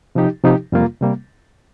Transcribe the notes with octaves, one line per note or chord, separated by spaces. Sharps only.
C3 F3 D#4 G4
C3 F3 D#4 G4
F2 C3 G3 A#3 F4
C3 G3 A#3